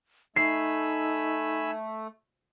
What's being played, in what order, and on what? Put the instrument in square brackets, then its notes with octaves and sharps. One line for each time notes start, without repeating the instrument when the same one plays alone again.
[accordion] A3 [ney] D#4 [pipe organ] G#5 B5 E6 [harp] C7